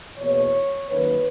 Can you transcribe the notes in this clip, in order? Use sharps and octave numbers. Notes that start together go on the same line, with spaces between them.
E2 B2 A#3 C#5
F#2 D#3 A#3 B4